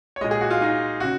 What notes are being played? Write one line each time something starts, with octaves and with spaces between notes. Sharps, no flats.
C#5
A#2 G#3 D#5
G#4
F#4
F4
D#4
C#3 F#4